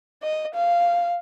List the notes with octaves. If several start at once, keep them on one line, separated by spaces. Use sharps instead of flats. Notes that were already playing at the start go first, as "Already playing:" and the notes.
D#5
F5